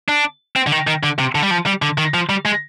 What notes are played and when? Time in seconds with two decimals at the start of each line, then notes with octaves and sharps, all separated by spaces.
0.09 D4
0.56 C4
0.67 D3
0.72 D#3
0.87 D#3
1.03 D3
1.19 C3
1.35 D3
1.43 G3
1.51 F3
1.66 G3
1.82 D3
1.98 D#3
2.14 F3
2.29 G3
2.45 G#3